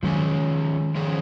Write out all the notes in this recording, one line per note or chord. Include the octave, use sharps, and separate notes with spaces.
D#3 F3 F#3 G#3 C#4 G#4
F3 G#3 C#4 G#4